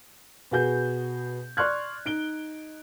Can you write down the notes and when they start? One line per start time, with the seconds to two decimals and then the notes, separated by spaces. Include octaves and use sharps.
0.51 B2 B3 F#4 G#4 G6
1.57 D5 C6 C#6 F6 F#6 G#6
2.06 D#4 D7 G7